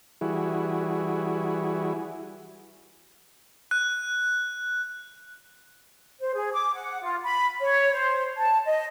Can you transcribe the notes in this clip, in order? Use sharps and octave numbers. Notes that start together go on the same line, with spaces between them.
E3 G3 E4 F#4 G#4
F#6
C5
G#4
D6
F#5
F4
B5
C#5
C5
A5
D#5